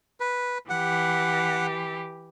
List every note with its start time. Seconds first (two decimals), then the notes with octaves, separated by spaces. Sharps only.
0.20 B4
0.70 E3 G4 F#5